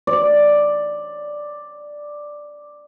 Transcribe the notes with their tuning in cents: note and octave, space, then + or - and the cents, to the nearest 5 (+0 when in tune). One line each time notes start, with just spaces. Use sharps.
D5 +5